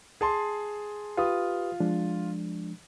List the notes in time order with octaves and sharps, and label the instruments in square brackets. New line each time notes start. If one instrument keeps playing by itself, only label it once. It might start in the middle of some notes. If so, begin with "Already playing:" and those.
[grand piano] G#4 A5 C6
[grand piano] F4 [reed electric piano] G4 B4 D#6
[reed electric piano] F3 G#3 D4